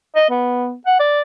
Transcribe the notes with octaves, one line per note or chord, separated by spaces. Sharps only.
D#5
B3
F#5
D5